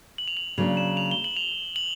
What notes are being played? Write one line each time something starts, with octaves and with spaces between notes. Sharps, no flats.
F#7
F7
F#7
C#3 F#3 A#3 D4 F7
E7
F7
G7
F#7
F7
F#7